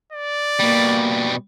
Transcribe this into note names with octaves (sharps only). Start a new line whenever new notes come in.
D5
B2 G3 A#3